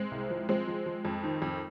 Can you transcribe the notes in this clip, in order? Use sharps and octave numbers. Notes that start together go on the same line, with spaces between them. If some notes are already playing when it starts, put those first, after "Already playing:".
Already playing: G#3 C4
C2
F3
F3 G#3 C4
F3
F3
F2
D#3
F2